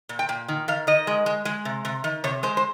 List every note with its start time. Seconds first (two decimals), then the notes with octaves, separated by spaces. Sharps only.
0.09 A#2
0.19 G5
0.29 A#2
0.48 D#3
0.68 D#3 F5
0.87 D#3 D#5
1.07 G#3
1.26 G#3
1.45 G#3
1.65 C3
1.85 C3
2.04 D#3
2.24 C3 C#5
2.43 G#3 C5
2.57 C5